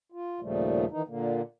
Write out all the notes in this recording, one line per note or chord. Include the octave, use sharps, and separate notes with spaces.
F4
D#2 A#2 C#3 F3 G3 A3
D#3 E3 D#4
A#2 D3 A#3